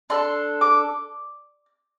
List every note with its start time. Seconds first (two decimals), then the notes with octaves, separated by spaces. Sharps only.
0.10 D4 A4 C6
0.61 D6